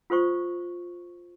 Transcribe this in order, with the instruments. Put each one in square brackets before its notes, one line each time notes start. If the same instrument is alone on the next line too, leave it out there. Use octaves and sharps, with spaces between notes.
[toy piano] F4 A4 C5 C#6